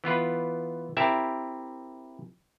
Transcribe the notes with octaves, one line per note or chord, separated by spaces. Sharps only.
E3 B3 F4 B4
C4 E4 G4 A#4 E5 A5